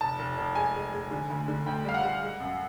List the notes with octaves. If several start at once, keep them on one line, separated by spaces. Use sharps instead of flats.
F1 A5
F1
F1
G#3 G#5
G#3
G#3
D3
D2
D3
D2 G5
G3 F5
F#5
G3
G#3
F#2